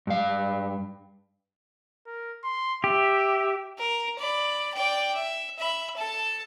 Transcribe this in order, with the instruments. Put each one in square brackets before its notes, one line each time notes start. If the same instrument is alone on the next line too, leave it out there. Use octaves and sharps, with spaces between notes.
[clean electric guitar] G2 F5
[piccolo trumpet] A#4
C6
[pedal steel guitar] G4 [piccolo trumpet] E5
[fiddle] A#4
D5 B5
D5 G5
E5
E5 B5
A4 A5